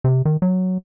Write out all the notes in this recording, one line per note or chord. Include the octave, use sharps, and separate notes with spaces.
C3
D#3
F#3